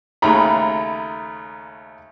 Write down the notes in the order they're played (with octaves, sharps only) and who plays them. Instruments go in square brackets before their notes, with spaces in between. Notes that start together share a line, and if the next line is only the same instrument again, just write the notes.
[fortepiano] D#2 C#3 A3 [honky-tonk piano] A#5 B5